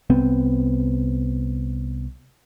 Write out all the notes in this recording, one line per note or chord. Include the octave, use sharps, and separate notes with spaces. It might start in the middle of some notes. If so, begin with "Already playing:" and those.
C2 B3 C4